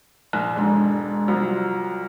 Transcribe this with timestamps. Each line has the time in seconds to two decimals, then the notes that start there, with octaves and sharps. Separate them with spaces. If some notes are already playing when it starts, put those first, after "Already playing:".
0.33 A#1
0.55 E1 G#2 D3
1.28 C2 F3 F#3